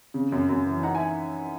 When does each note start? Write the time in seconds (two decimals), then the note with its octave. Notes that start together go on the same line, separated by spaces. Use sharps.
0.14 C#3
0.32 F#2
0.49 F#2
0.66 E3
0.83 D#4 F#5 A#5
0.95 E5 G#5